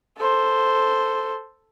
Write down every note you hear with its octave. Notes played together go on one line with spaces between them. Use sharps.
A4 C5